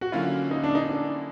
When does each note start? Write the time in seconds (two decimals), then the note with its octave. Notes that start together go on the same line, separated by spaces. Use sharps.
0.01 F#4
0.12 D3 F#3 A#3 C#4 E4 F4
0.51 D#4
0.64 D4
0.75 D#4
0.89 D4